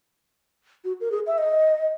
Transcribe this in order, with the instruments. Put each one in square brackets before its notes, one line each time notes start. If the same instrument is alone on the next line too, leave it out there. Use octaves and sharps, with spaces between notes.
[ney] F#4
A#4
G#4
E5
D#5